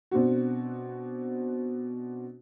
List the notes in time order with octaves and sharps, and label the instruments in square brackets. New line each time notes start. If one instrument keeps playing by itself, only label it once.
[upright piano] B2 C4 D4 F#4